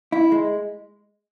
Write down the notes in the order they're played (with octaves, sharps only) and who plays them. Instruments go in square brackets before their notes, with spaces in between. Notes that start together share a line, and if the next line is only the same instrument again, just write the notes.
[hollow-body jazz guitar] E4
G#3